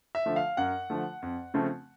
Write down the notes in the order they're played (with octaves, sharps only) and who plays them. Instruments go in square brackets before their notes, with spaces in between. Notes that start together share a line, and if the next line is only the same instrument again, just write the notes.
[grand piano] E5
D3 F3 A3
F5
F#2 F#5
D3 F3 A3
F2
C#3 F3 A3 C4